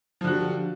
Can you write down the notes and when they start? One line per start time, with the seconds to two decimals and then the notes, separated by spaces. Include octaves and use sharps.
0.21 F3
0.24 D3
0.27 F#4
0.30 G3